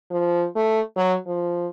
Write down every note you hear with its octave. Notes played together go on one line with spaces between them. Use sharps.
F3
A3
F#3
F3